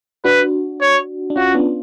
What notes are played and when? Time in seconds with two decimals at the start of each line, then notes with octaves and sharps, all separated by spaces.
0.24 D4 F#4 B4
0.81 C#5
1.30 D4
1.36 C#4 F4 F#4
1.55 B3 D4